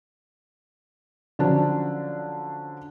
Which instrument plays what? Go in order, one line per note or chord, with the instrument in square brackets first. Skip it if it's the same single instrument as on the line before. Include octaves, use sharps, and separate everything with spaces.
[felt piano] D3 F3 F#3 C#4 D4